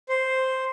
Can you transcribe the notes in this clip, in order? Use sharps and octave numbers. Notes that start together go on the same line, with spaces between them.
C5